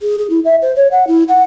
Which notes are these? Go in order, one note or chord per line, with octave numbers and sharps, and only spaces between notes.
G#4
G#4
E4
E5
C5
C#5
F#5
E4
F#5